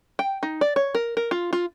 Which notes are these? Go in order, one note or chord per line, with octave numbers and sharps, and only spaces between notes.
G5
D#4
D5
C#5
A#4
A#4
F4
F4